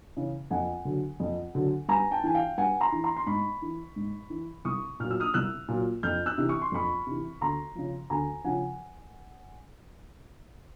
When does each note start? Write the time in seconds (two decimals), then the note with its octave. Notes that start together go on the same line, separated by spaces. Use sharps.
0.16 C#3 E3
0.51 F2 F#5 G#5
0.85 D3 F#3
1.20 F2
1.55 D3 F#3
1.89 G2 G#5 A#5
2.11 G5 A5
2.24 E3 G#5
2.35 F5 G5
2.58 G2 F#5 G#5
2.80 A#5 C6
2.92 E3
3.04 A#5 C6
3.16 C6
3.27 G#2 B5 C#6
3.62 E3
3.96 G#2
4.30 E3
4.65 C2 C#6 D#6
5.00 A#2 F#3 F6
5.11 E6
5.20 D#6 F6
5.34 C2 E6 F#6
5.68 A#2 F#3
6.03 F2 F6 G6
6.26 E6 F#6
6.38 C3 E3
6.49 C#6
6.62 C6
6.72 F2 B5 C#6
7.07 C3 E3
7.41 D2 A#5 C6
7.75 C#3 F3
8.10 D2 G#5 A#5
8.45 C#3 F3 F#5 G#5